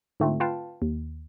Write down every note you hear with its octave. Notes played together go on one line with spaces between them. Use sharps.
G#2 D3 A3 C4 F4
F4 B4 F5 G5 A5
D#2